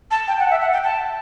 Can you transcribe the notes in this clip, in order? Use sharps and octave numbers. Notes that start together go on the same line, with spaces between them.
A5
G5
F#5
E5
F#5
G5
A5